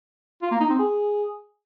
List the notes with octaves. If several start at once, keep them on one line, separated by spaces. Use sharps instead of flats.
F4
A#3
D#4
C4
G#4